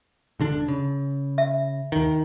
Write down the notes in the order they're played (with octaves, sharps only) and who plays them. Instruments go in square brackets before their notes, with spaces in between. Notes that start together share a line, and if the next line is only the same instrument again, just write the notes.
[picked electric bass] E1 D3 D4
C#3
[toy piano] E5
[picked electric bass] D#2 D#3